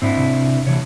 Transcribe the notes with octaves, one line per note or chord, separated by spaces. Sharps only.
G#2 C4 D4 E4
C3
C3 E3 C#5